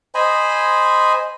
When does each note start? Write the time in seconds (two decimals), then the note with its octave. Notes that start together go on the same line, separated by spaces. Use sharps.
0.15 C5 D#5 G#5 B5